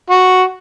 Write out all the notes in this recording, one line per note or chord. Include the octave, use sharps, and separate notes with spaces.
F#4